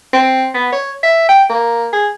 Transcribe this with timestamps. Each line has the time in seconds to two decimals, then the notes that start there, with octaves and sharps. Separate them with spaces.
0.13 C4
0.54 B3
0.73 C#5
1.03 E5
1.29 G5
1.50 A#3
1.93 G#4